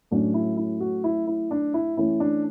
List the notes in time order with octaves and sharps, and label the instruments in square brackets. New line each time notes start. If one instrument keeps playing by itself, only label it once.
[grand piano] A2 F#3 A3 C#4 D4
E4
E4
F#4
E4
E4
D4
E4
E3 A3 C#4 E4
D4